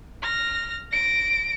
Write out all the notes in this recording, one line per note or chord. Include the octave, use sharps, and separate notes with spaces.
F6 A#6
A#6 D7